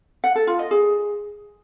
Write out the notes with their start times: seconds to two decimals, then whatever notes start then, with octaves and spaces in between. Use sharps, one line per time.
0.24 F#5
0.35 A4
0.47 F4
0.59 D#5
0.71 G#4